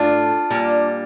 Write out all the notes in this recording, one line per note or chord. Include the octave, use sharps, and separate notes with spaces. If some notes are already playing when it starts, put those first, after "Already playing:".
Already playing: A2 A3 D4 F4
A#2 G3